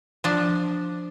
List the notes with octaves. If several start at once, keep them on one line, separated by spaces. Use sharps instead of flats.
F3 D4